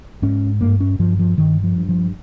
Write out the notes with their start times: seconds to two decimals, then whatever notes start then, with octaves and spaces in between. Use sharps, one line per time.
0.22 G#2 C#4
0.61 G2 A#3
0.80 C#4
0.99 G2 F3
1.19 F3
1.38 G2 D#3
1.64 F3
1.76 G2
1.89 F3